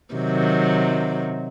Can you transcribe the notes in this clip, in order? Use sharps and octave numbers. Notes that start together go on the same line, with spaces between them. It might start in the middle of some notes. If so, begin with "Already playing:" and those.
C3 D#3 F#3